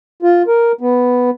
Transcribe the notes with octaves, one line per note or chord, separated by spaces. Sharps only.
F4
A#4
B3